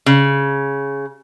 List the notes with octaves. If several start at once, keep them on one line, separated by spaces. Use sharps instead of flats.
C#3